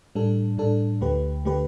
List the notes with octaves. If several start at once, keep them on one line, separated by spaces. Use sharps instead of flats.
A2 G3 D4 A4
A2 G3 D4 A4
D2 D3 A3 G4 B4
D3 A3 G4 B4